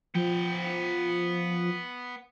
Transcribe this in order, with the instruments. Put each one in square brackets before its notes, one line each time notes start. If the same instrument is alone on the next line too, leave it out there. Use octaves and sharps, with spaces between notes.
[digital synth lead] F3 [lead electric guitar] B3 G5